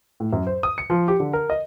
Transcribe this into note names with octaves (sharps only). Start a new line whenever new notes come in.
A2
F#2
C5
D#6
C#7
F3
G4
D3
A#4
D#5